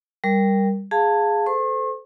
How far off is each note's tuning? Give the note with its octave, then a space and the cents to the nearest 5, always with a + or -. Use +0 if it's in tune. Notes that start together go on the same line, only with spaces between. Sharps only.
G3 +5 A#4 +0
G#4 -5 F5 +0 A5 +15
A4 -10 C5 -25 C#6 -45